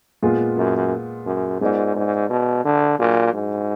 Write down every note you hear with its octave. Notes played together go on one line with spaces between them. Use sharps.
A#2 G#3 B3 F4 G#4
F#2
F#2
G#2 G#3 B3 F4 A#4 D5
G#2
B2
D3
A#2 F#3 D4 G#4
G#2